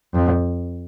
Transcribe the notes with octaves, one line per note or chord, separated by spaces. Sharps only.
F2